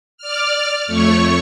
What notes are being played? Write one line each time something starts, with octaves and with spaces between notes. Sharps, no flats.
D5 F6
F2 A3 C#5 C#6